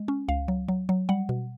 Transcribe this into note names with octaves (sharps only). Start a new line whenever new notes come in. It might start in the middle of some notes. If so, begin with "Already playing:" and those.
Already playing: G#3
C#4
C#2 F5
F#3
F#3
F#3
G3 F#5
B2